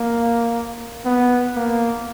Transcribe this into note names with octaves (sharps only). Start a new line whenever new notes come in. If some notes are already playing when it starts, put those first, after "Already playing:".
Already playing: A#3
B3
A#3